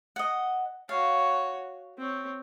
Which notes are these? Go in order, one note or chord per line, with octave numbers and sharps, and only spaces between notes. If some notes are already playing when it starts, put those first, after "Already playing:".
D#5 F#5
F#4 C#5 F5
C4 C#5